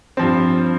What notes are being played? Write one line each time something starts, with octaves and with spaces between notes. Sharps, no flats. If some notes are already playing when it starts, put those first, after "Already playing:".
G2 F3 C4